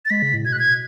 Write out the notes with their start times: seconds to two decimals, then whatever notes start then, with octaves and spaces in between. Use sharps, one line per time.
0.05 A6
0.10 G#3 B6
0.22 C#3
0.33 A2
0.45 B2 G#6
0.52 F#6
0.59 G#6